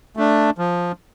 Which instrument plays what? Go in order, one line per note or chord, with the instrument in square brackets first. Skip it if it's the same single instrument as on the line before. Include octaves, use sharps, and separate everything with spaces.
[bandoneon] A3 D4
F3